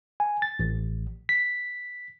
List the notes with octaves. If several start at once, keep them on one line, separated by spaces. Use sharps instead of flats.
G#5
A6
A1
B6